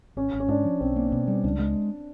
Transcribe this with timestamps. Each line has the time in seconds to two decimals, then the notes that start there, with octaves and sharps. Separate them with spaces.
0.16 G#1 C#4
0.33 G#1
0.40 C#4
0.48 G#2 D4
0.64 F3
0.80 B1 C4
0.96 A#3
1.12 B2
1.28 G3
1.44 C#2 D4
1.59 G#3